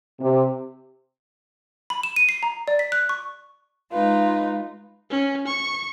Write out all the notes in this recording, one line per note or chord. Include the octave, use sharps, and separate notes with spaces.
C3
B5
E7
D#7
C7
A#5
D5
B6
F#6
C#6
G#3 D#4 F4 B4
C#4
C#6